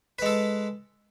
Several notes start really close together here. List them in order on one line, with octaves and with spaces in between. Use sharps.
B4 G#3 A4